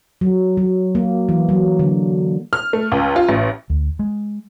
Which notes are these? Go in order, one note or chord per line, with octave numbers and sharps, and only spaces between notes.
F#3
F#3
A#3
E3
F#3
D3
F6
A3
C#2
F4
A1
D2
G#3